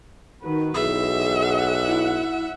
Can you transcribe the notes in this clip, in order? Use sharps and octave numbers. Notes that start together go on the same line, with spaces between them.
D#3 F#4 B4
B1 E3 G#4 E5
F#5
E4